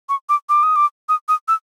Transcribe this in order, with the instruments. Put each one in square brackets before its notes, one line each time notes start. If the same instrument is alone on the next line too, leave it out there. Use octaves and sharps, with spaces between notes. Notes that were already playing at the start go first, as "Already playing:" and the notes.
[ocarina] C#6
D6
D6
D#6
D6
D#6
D#6
E6